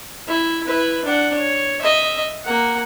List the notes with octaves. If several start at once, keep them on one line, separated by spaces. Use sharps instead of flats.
E4
E4 B4
D4 F#5
C#5
D#5 E5
A#3 F#5